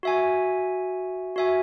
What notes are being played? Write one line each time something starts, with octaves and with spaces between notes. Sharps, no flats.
F#4 E5 G#5
F#4 E5 G#5